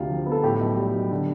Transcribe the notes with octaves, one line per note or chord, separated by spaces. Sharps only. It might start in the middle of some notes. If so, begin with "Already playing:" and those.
Already playing: D2 C3 F4
F3
B3
A4
A2 G4
B1
G3
B1
D3